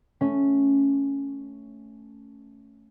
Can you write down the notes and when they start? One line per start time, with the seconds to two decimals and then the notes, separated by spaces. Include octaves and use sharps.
0.21 A3 C#4